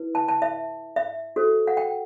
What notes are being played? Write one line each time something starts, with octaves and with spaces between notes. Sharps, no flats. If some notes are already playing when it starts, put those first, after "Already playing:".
Already playing: E4 B4
A5
A5
E5
E5
F#4 A4 C5
F#5
G5